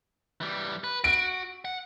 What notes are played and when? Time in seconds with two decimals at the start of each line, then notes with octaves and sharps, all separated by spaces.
0.41 E3 G3
0.84 B4
1.04 F#4 D7
1.65 F#5